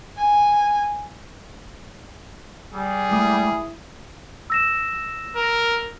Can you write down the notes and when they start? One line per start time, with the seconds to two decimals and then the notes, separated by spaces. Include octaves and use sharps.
0.17 G#5
2.74 G3 G#4
3.11 G#3 A3 E4 D#6
4.50 E6 A#6 E7
5.36 A#4